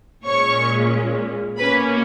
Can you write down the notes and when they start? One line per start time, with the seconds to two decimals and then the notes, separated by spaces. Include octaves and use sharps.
0.25 A#2 G#3 C#4 C#5 C#6
1.58 B2 A#3 C#4 B4 B5